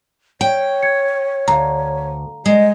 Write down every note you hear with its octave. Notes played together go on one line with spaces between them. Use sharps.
C#5 G5
G#6 C#7
D2 F5 A#5
G#3 D#5